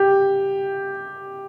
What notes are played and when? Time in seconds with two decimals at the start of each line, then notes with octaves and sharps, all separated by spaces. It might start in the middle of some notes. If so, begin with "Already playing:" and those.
Already playing: G4